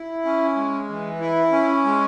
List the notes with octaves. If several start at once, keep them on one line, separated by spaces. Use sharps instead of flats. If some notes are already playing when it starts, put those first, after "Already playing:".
Already playing: E4
C#4
G#3
E3
E4
C#4
G#3